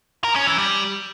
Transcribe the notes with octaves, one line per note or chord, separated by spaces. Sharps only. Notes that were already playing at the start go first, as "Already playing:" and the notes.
A#4
C#4
E3
G3